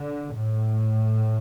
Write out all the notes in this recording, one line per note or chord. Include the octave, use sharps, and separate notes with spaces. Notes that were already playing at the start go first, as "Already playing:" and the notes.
Already playing: D3
A2